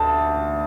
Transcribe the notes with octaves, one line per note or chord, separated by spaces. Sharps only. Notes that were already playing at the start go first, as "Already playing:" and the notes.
Already playing: D2 A5